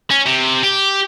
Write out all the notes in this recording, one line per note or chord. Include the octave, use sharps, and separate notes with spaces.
C#4
C3
G4